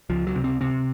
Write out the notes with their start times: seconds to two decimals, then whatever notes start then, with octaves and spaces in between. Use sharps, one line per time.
0.10 C#2 F3
0.27 F#3
0.35 C3
0.44 C4
0.61 C3 C4